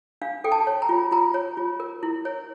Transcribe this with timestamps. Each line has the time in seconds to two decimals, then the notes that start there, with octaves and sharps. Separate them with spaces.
0.22 D4 F5
0.44 A4 G5
0.52 A5
0.67 C#5
0.82 A#5
0.89 F4
1.11 F4 A#5
1.34 C#5
1.57 F4
1.80 A#4
2.03 E4
2.25 C#5